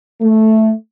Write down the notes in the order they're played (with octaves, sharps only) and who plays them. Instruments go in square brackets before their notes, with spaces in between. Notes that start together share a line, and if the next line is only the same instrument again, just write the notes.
[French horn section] A3